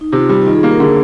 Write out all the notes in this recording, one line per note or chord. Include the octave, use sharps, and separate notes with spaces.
D#4
C3 F4
G3
D#4
D#3 F4
G#4
A#3 G4
A#4
D3 G#4